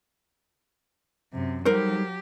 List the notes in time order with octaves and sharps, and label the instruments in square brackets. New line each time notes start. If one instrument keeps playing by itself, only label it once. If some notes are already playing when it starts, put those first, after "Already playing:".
[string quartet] F#2 C3
[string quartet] F#3 G4 [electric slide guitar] G3 D#4 A4 [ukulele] A#4 C5